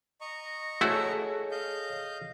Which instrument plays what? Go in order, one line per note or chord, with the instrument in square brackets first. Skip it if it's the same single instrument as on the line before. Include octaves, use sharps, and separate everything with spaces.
[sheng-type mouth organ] D#5 A#5 C#6
[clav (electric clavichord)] A3 E4 F#4 [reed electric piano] G#4 A4 C#5
[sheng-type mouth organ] D#5 F5 G6